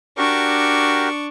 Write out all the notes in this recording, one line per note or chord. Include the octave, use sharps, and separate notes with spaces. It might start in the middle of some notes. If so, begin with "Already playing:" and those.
D4 F#4 G4 A#4 C#6